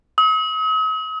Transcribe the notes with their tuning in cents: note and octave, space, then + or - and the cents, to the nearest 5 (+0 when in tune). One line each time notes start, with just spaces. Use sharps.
D#6 +45